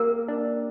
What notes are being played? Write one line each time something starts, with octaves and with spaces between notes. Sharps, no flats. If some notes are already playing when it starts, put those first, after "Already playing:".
Already playing: A#3 G4 A#4
D4